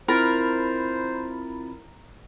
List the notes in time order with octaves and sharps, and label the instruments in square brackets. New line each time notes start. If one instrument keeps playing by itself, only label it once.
[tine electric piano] C4 F4 B5 [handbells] E4 A#5 A6 [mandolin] A#4 [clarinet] C5